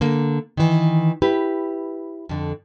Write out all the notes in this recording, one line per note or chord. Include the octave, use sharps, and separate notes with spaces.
D3 A#3
D#3 E3
E4 G4 B4
F2 D3